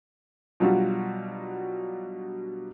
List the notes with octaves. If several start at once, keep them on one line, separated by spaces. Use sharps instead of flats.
B2 F#3 G3 D4 F4 F#4